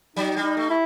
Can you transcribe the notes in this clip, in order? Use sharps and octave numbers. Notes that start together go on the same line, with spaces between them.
F#3 D#4
G3
D#4
A3
E4